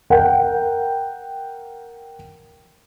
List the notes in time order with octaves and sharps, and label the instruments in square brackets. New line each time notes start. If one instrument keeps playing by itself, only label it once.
[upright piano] A#4 F#5 G5